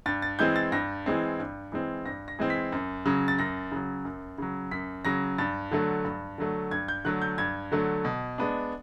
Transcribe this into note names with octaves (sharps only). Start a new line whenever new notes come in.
G2 A6
A6
E3 G#3 C4 G6
A6
G2 A#6
E3 G#3 C4
G2
E3 G#3 C4
G2 A#6
A#6
E3 G#3 C4
B6
F#2
C#3 F#3
A6
F#2 A#6
C#3 F#3
F#2
C#3 F#3
F#2 B6
C#3 F#3 A#6
G2 A6
D3 F#3 A3
G2
D3 F#3 A3
G2 G#6
G6
D3 F#3 A3 F#6
G6
G2 G#6
D3 F#3 A3
B2
G#3 B3 D4